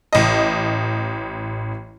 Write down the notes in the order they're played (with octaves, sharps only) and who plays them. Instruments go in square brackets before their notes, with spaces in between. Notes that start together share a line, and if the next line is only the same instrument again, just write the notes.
[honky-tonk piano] A1 D#5